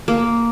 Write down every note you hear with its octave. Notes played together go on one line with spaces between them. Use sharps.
A#3